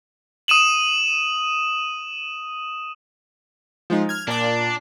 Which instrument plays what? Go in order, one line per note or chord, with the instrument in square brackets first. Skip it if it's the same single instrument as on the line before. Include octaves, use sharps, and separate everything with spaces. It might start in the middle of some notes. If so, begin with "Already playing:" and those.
[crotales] D#6 D#7 E7 F#7
[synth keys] F3 G#3 D#4
F6 G#6
[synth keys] A#2 D5 [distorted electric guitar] D4